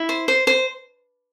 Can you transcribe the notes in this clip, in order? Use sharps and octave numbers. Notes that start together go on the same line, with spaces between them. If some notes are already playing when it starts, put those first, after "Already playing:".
Already playing: E4
C5
C5
C5